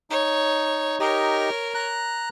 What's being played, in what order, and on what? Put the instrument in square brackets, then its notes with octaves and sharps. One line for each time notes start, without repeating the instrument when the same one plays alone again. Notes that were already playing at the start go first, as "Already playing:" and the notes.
[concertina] D#4 [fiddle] C#5
[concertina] D#4 G4 D#5 [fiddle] A#4 C#5
[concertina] A#5 F#6